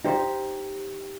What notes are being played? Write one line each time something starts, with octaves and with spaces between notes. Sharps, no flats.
D#4 G4 C5